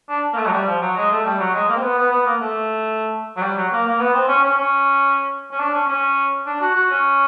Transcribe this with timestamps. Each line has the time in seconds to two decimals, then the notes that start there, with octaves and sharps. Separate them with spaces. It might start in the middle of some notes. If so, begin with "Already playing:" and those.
0.09 D4
0.33 A#3
0.37 A3
0.46 F#3
0.52 G3
0.66 F3
0.82 F#3
0.96 G#3
1.11 A3
1.25 G3
1.39 F#3
1.54 G#3
1.69 A#3
1.76 C4
1.83 B3
1.97 B3
2.11 B3
2.26 A#3
2.41 A3
3.37 F#3
3.42 G3
3.56 F#3
3.72 A#3
3.86 A#3
3.99 B3
4.14 C4
4.28 C#4
4.43 C#4
4.58 C#4
5.52 C#4
5.60 D4
5.74 C#4
5.88 C#4
6.46 D4
6.61 F#4
6.75 F#4
6.90 C#4